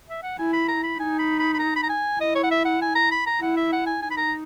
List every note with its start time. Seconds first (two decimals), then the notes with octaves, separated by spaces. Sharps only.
0.08 E5
0.23 F#5
0.38 E4 G#5
0.53 B5
0.68 A#5
0.83 B5
0.99 D#4 G#5
1.19 B5
1.39 B5
1.54 B5
1.59 A#5
1.76 B5
1.83 A#5
1.89 G#5
2.20 E4 D#5
2.35 C#5
2.43 F#5
2.51 E5
2.65 F#5
2.81 G#5
2.95 A#5
3.11 B5
3.26 A#5
3.41 E4 F#5
3.57 E5
3.72 F#5
3.86 G#5
4.01 D#4 G#5
4.11 B5
4.17 A#5